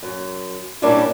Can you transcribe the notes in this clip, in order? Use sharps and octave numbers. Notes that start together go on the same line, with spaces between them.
F#2
A#2 G3 A#3 C#4 D4 E4